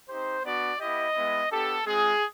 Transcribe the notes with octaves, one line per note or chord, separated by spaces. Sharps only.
C4 D#4 G4 C5
B3 D4 F#4 D5
B3 E4 G4 D#5
G#3 B3 E4
B3 D4 G4 A4
G#3 C4 F4 G#4